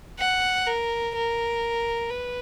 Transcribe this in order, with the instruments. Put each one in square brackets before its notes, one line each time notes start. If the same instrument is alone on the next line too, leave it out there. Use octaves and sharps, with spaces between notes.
[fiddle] F#5
A#4
A#4
B4